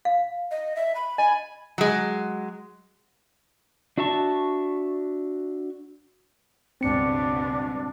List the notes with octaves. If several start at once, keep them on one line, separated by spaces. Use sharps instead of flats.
F5
D#5
E5
B5
D#5 G#5
F#3 G#3
D4 F#4 E5 A5 C#6
C#2 G2 B2 C4 D4 C#7